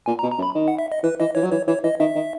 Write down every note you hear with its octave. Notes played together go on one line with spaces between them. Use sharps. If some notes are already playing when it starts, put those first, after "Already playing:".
A#2 G#5
A#5
B2
A#5
F#2
B5
D#3
F#5
E5
D#5
E3 B4
E3 D#5
E3 C#5
F#3
E3 C#5
E3 C#5
E3 D#5
D#3 E5
D#3